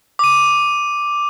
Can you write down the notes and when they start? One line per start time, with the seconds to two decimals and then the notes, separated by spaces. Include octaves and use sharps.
0.19 D6 D#7